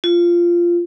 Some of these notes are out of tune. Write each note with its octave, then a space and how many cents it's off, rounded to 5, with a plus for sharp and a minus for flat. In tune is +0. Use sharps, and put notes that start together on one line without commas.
F4 -10